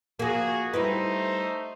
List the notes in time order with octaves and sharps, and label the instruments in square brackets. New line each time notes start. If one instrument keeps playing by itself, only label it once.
[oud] F3 A#3 [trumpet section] F#4 G#4
[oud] G3 E4 B4 [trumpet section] A3 D#4 C5